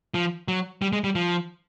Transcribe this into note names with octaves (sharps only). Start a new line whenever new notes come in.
F3
F#3
G3
G#3
G3
F3